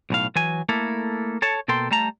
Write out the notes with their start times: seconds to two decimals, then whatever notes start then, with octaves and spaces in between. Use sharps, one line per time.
0.10 B1 A2 F5
0.36 E3 F#3 G#5
0.69 A3 A#3 E4 A4
1.42 A4 C#5 A5
1.68 B2 A#3 A4 G5 C6
1.91 G3 A3 A5 A#5